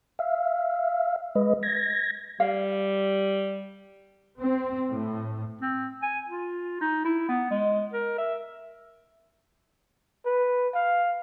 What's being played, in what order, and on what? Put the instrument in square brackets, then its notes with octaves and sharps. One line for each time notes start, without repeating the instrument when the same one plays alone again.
[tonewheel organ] E5 F5
G#3 B4 D#5
G#6 A#6
[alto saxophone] G3 [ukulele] F5
[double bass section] C4
A2
[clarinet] C4
G#5
F4
D#4
E4
B3
G#3
A#4
E5
[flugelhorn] B4
F5